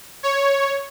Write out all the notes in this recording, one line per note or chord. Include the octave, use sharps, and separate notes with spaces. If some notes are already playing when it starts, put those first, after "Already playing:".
C#5